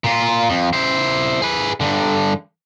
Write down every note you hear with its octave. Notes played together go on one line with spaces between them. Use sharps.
A#2 F4
F2
E4 C5
G#4 B4
G2 D3